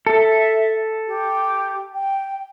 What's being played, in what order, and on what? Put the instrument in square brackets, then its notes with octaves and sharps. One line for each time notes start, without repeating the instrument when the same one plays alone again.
[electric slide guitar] A4 [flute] E5
[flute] G4
G5